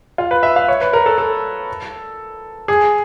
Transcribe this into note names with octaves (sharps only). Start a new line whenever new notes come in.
F4
B4
E5
F5
C#5
B4
A#4
A4
A4
G#4